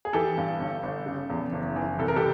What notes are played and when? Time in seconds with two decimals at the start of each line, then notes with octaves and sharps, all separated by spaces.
0.05 G#4
0.13 E3 G4 A4
0.38 G2
0.60 G1
0.83 G1
1.06 C#3
1.30 E2
1.53 F#1
1.76 E3
1.98 C2 A4
2.08 A#4
2.16 G4 A4